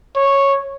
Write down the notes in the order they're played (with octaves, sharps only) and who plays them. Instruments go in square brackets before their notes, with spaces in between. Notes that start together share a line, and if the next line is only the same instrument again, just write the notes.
[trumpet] C#5